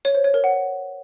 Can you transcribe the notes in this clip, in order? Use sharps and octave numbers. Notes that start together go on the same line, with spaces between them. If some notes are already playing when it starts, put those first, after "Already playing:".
C#5
C5
C#5
A#4
F#5